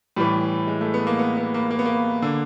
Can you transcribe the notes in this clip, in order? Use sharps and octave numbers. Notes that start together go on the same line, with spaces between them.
A2 E3 G3
G#3
A3
B3
A#3
B3
B3
A#3
A#3
B3
A#3
D3